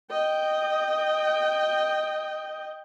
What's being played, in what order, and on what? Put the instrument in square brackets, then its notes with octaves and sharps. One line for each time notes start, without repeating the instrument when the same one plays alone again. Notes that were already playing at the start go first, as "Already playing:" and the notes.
[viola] D#5 G5